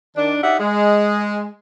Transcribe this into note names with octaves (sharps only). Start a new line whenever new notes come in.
D#3 D4
D#4 G4 D5 E5 F#5
G#3